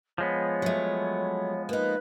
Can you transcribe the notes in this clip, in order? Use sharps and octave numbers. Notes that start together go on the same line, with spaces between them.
F3 G#3 B3 C#5
F#3 A3
A#3 D#4 B4